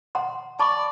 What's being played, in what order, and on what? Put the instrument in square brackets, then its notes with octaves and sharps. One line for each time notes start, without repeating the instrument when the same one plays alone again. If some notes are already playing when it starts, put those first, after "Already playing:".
[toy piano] F#5 A#5 C6
[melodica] D5 [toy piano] A5 B5 C#6